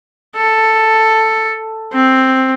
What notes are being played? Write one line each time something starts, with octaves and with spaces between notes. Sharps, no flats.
A4
C4